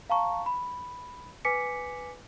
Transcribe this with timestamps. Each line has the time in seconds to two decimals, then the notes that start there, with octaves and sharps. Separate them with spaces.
0.10 F5 A5 A#5 C#6
0.46 B5
1.45 B4 G#5 D6 B6 C#7